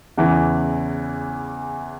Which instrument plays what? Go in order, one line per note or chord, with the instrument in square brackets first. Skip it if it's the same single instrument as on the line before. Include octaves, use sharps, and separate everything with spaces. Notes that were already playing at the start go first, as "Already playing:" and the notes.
[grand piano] E2 C#3 E3